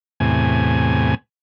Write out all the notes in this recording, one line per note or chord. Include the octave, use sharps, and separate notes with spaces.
E2 A2 C3 G#5